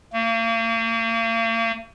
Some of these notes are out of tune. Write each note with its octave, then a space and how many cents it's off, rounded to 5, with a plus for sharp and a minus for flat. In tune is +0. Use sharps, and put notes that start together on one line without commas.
A#3 -40